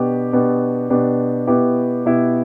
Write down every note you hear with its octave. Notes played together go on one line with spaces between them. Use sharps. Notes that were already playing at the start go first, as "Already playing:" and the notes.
Already playing: B2 B3 D4 G4
B2 B3 D4 G4
B2 B3 D4 G4
B2 B3 E4 G4
B2 B3 E4 G4